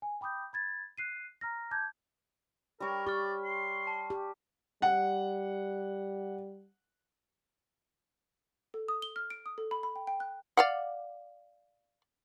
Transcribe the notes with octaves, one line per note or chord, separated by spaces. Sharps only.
G#5
G5 B5 D6 D#6 G6
B5 G#6 A6
F#6 C7 D#7
A#5 F6 A#6
A5 D6 G6 G#6
G3 A#4 C#5
G4 D5 C#6 F6
C6
A5
G4
G3 F#5
A4
D#6
G7
F6
D7
D#6
A4
B5
B5
G5
G5
F#6
D5 F5 F#5